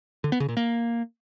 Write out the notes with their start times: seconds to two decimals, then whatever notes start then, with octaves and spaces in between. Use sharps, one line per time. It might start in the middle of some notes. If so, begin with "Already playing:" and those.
0.24 D3
0.32 B3
0.40 C#3
0.49 A#2
0.57 A#3